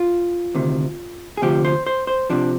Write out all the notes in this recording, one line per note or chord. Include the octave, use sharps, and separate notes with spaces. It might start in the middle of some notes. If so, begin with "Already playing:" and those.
Already playing: F4
D2 C3 D#3
G#4
D2 C3 F3 G4
C5
C5
C5
C3 F3 D4